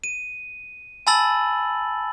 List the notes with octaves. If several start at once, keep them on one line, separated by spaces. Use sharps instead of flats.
D#7
G#5 A5 B5 E6 A6 F#7